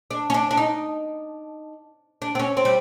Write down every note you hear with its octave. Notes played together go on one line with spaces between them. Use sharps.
D4
C#4
D4
D4
D#4
D4
C4
C#4
C4
G3